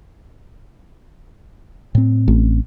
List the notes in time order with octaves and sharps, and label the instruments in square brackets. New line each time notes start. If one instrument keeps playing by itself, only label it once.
[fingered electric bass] A2 C4
[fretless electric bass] A1